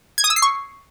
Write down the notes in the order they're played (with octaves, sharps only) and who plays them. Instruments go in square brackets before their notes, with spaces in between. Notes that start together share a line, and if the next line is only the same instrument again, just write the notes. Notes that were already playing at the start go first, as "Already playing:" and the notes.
[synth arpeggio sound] G#6
D#6
E6
C7
C#6